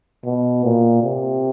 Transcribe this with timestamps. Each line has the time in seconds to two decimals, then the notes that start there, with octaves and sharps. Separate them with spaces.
0.25 B2
0.64 A#2
1.03 C3